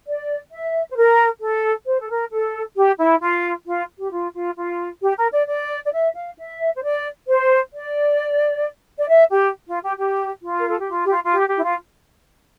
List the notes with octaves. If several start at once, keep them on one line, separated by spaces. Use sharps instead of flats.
D5
E5
C5
A#4
A4
C5
A4
A#4
A4
G4
E4
F4
F4
G4
F4
F4
F4
G4
A#4
D5
D5
D5
E5
F5
E5
C5
D5
C5
D5
D5
E5
G4
F4
G4
G4
F4
A#4
A4
G4
F4
G4
F4
F4
G4
G4
E4
F4